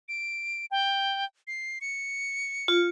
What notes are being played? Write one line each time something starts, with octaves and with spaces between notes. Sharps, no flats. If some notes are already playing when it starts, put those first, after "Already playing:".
D7
G5
C7
C#7
F4